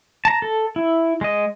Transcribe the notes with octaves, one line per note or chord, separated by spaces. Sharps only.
A5 A#5
A4
E4
G#3 D#5